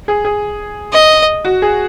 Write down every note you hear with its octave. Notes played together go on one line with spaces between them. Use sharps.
G#4
G#4
D#5
F#4
G#4